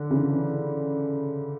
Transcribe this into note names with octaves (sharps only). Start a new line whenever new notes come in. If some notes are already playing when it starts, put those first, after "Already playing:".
Already playing: D3
C#3 E3